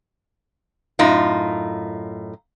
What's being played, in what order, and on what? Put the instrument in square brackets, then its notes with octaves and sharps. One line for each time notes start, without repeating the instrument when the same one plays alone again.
[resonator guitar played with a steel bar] F#2 A2 D#4 F4